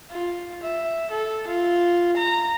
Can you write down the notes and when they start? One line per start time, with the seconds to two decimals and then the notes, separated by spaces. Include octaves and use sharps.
0.11 F4
0.63 E5
1.11 A4
1.48 F4
2.17 A#5